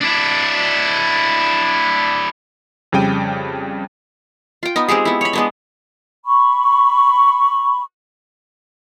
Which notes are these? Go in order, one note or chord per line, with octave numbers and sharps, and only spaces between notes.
D4 E4
F2 C#3 G3 G5 D#7
F4 G5
B3 D#4
G#3 C4 G4 G#4
B3 E4
C#5 B5
G#3 B3 D4
B5 C#6